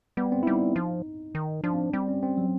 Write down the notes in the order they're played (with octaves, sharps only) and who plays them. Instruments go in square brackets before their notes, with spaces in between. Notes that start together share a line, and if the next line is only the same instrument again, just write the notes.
[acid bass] G3 [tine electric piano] B3
[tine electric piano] C4
E4
[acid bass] G3 [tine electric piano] D#4
[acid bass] F3
D#3
[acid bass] F3 [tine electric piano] D4
[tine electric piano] C4
[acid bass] G3 [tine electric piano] C4
[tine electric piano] C#4
C4
F#3